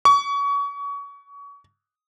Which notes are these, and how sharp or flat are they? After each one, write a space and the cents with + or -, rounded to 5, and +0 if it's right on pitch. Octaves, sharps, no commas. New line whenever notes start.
C#6 +30